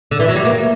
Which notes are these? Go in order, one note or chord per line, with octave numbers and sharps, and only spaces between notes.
D3
E3
F#3
G3
A#3